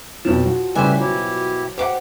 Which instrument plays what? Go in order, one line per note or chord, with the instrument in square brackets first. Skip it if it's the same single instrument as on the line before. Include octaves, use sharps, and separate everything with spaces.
[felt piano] F2 B2 E7 [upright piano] F3 F#3
[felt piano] F3 [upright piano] F#4
[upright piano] A2 C#3 G3 [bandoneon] G4 B4 E5 [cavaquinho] C5 G#5
[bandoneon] B2 E4 G4 [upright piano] F#3
[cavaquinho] G4 D6 [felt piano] C5 F#5